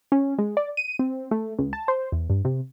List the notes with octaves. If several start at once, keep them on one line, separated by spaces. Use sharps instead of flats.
C#4
G#3
D5
D#7
C4
A3
C#2
A5
C5
E2
G2
C3